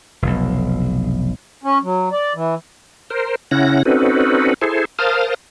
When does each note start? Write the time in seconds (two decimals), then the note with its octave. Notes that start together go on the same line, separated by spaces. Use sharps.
0.22 F1 B1
1.63 C#4
1.83 F#3
2.12 D5
2.35 E3
3.10 A#4 C5
3.51 C#3 C#4 E4 F#5 A#6
3.85 C4 C#4 D#4 F#4 A4 B4
4.62 E4 G#4 A4 C5
4.99 A#4 C5 F5 A5 D#6 F6